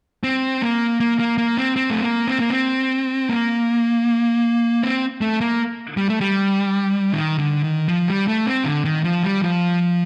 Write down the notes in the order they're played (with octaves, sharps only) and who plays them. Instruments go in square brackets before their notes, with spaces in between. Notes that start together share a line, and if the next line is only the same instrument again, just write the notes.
[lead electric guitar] C4
A#3
A#3
A#3
A#3
C4
C4
A3
A#3
C4
A#3
C4
A#3
C4
A3
A#3
G3
A3
G3
D#3
D3
D#3
F3
G3
A3
C4
D3
D#3
F3
G3
F3